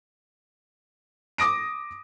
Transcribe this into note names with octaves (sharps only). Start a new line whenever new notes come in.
D6 D#6 A#6 D7